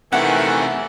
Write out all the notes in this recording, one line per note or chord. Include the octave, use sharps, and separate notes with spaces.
C3 D#3 E3 A3 C#4 F#5